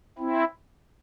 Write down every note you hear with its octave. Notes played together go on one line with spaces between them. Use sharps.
C4 E4